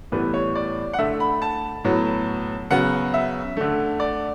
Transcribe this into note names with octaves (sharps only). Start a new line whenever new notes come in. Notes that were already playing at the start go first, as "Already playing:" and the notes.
A2 E3 G3 B3 B4
C#5
D5
F#5
D3 A3 E5
B5
A5
A2 F#3 B3
C#3 F#3 B3 F#5
E5
D3 A3
D5